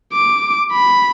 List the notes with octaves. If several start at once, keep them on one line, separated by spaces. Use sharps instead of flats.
D6
B5